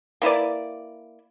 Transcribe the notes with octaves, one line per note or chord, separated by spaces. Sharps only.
A#3 E4 B4 D5